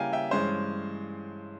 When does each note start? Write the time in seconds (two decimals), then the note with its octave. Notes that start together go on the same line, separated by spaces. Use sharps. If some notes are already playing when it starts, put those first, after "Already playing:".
Already playing: C#3 G3 A#3 E4 F5 G5 G#5 A#5
0.13 E5 G5
0.31 G2 E3 G#3 C#4 C5